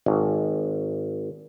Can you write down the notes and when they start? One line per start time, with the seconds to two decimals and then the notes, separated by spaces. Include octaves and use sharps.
0.06 G#1